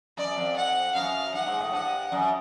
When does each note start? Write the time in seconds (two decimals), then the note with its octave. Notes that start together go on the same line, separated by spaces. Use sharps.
0.17 F#2 D5
0.36 F2
0.56 F#5
0.95 F#2 F5
1.34 G2 F#5
1.46 G#2
1.60 A2
1.73 G2 F#5
2.12 F#2